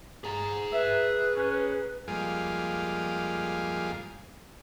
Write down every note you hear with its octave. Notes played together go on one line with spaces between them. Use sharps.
G#4 A#5
B4 E5
C#4
F2 G3 G#3 A#3 F4 G#4